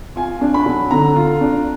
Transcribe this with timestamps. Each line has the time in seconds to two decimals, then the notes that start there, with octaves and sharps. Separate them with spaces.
0.16 F4 G#5
0.41 D4
0.54 B5
0.66 F#3
0.91 D3 A#5
1.16 F4
1.41 D4